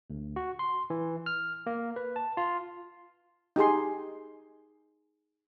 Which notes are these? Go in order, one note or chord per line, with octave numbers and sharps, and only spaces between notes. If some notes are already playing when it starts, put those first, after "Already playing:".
D2
F#4
C6
E3
F6
A#3
B4
A5
F4
D#4 G4 G#4 C6